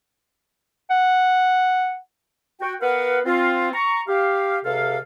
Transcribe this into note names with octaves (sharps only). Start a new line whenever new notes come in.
F#5
F#4 G5
B3 A#4 B4 F5 F#5
C4 F4
A#5 C#6
G4 F5
C#2 C3 A4 F5